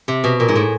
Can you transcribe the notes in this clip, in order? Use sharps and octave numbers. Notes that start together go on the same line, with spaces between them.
C3
B2
A#2
G#2
A2